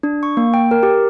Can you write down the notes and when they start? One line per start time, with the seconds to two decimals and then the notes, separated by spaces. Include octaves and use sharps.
0.03 D4
0.23 C#6
0.37 A#3
0.54 G5
0.71 A#4
0.83 G4